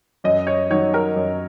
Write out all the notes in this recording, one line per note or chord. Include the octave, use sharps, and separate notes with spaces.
F#2 D#5
C#5
D#3 F#3 D#4 C#5
A#4
F#2